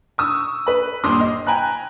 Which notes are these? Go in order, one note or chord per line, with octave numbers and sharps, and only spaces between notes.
C#6 D#6 E6
B4 B5
G1 D#2 A#2 C6 D6 D#6
D#5
G5 G#5 A#5 B5 F#6